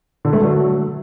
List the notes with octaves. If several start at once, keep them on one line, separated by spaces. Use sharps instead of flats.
D3
A3
F#3